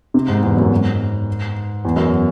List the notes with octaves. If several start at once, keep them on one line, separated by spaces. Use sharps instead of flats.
C3
G#2
E2
F#2
G#2
E2
F#2